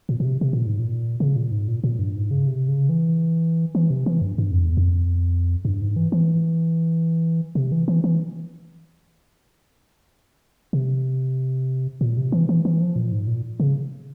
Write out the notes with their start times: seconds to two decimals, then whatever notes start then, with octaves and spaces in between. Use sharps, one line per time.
0.09 A#2
0.20 A#2
0.24 C3
0.41 C3
0.53 A#2
0.67 G#2
0.80 A#2
1.20 C#3
1.36 A#2
1.51 G#2
1.68 A#2
1.84 A#2
1.99 G2
2.16 G#2
2.31 C#3
2.47 C3
2.68 C#3
2.89 E3
3.75 E3
3.90 C3
4.06 E3
4.21 G2
4.38 G2
4.51 F2
4.64 E2
4.77 F2
5.65 G2
5.81 G#2
5.96 E3
6.12 E3
7.55 C3
7.72 E3
7.88 E3
8.04 E3
10.73 C3
12.01 A#2
12.17 C3
12.32 E3
12.49 E3
12.65 E3
12.81 F3
12.96 A#2
13.12 G#2
13.27 A#2
13.60 C#3